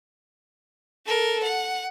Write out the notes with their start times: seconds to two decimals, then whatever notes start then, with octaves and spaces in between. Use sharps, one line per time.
1.06 A4 A#4
1.43 F#5